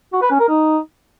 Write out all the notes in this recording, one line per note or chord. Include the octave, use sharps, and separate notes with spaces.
F#4
B4
C#4
A#4
D#4